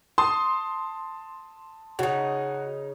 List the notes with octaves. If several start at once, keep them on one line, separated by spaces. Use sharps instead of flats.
A5 C6 D#6
C#3 D#4 F#4